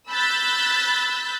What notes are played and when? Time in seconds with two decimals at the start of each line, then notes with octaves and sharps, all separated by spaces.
0.11 B5 E6 F#6 G6 A6 B6